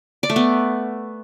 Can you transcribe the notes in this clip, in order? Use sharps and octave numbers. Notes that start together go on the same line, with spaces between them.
D5
A3
B3